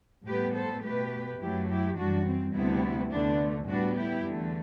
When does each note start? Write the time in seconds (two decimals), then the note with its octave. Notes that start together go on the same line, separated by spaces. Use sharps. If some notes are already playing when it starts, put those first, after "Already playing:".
0.26 A2 G3 B3 G4 B4
0.55 A4 C5
0.83 B2 A3 G4 B4
1.41 F#2 F#3 A3 E4 G4
1.69 E4 G4
1.97 F#2 E3 G3 D4 F#4
2.25 C4
2.54 D2 C3 G3 B3 C4 E4
3.11 D2 D3 A3 B3 D4
3.68 A2 G3 B3 D4 F#4
3.97 E4 G4
4.26 E2 D3 A3